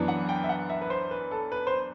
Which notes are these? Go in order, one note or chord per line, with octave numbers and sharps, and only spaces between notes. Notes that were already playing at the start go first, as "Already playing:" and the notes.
Already playing: F#2 E3 B3 D4
F#5
G5
E5
F#5
E5
B4
C5
B4
A4
B4
C5